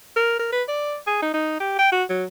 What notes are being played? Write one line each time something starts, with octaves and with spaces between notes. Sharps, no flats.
A#4
A#4
B4
D5
G#4
D#4
D#4
G4
G5
F#4
F#3